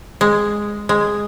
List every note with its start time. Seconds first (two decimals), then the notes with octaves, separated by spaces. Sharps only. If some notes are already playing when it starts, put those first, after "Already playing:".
0.21 G#3
0.89 G#3